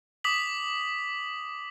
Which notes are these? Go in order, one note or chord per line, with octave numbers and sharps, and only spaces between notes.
D6 D#6 B6 F#7